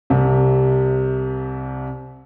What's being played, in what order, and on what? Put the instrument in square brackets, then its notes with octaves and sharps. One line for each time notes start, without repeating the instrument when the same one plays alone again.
[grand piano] C2 C3